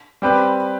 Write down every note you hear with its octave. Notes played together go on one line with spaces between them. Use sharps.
G3 C4 G4 B4